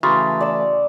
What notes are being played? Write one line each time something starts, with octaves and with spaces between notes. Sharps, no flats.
C#3 E3 A3 F#4 A#5 C6 A6
D5 E6